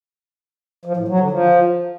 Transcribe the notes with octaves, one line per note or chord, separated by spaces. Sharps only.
F3
A2
F#3
D3
F3